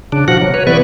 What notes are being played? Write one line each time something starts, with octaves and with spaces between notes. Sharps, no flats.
C#3 D4
B2 F3 F#4 F#5
F#3
B4 C#5
C3 E3 B3 B4 D5 C#6